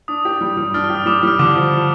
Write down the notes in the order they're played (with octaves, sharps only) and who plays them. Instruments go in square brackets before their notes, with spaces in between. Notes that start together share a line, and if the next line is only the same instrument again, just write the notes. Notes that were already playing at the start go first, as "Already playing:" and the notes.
[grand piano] D4 [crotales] D#6
[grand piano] G4
G3
G3
[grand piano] D4 [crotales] F6
[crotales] F6
[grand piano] G4
[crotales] D#6
[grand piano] G3 [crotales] D6
[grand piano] G3 [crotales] F6
[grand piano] D3 [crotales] D6
[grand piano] F3